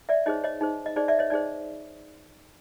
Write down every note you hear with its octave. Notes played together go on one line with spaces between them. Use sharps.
D5 E5
D#4 G#4 C5 C#5 D#5
C#5 D#5
D#4 G#4 C5
D#5
D#4 G#4 C5 D5
D5 E5
C#5 D#5
D#4 G#4 C5 D5